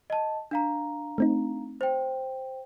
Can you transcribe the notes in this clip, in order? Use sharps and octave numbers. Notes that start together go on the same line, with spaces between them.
D#5 A5
D4 F5 A#5
A3 C4 D#4
C5 G5